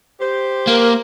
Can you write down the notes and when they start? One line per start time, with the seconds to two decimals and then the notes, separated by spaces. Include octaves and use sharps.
0.20 G4 C5
0.67 A#3 A#4